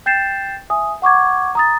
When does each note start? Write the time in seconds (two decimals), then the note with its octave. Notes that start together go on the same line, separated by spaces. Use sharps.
0.06 G5 G6 A6 C7 E7
0.70 E5 G#5 D#6
1.02 F#5 C#6 D6 G#6
1.55 A#5 D#6 A6